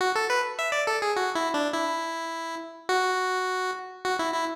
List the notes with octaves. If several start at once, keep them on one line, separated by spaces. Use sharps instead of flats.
F#4
A4
B4
E5
D5
A4
G#4
F#4
E4
D4
E4
F#4
F#4
E4
E4